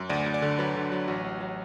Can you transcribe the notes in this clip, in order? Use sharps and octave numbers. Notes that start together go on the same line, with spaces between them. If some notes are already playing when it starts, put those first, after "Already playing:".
Already playing: F#2
D2 D5
D2
D5
D3
F#3 B4
D3
F#3
A1 F#4
A1
F#3